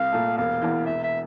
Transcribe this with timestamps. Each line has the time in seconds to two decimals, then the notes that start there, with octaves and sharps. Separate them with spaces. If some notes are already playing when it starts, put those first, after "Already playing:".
Already playing: C2 F5
0.12 A#2 A3
0.38 E1 F5
0.62 E2 E3
0.86 E1 E5
1.03 E5